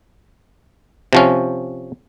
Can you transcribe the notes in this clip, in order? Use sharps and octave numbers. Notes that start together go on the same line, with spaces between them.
C3 F3 C#4